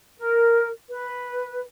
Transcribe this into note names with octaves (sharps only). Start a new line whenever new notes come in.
A#4
B4